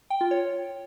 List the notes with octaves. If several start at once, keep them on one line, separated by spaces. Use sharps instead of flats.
G5
F4
C#5